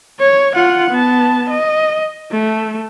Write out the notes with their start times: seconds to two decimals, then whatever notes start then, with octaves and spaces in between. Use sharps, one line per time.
0.19 C#5
0.55 F4 F#5
0.90 B3 A5
1.50 D#5
2.31 A3